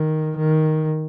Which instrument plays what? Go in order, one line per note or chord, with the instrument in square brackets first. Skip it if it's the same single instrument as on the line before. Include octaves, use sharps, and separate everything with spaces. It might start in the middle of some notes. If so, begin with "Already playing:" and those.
Already playing: [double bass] D#3
D#3